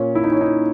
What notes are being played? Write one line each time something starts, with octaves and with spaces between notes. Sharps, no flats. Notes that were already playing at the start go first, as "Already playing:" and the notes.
Already playing: A#2 C#4
E4
D#4
C#4
D#4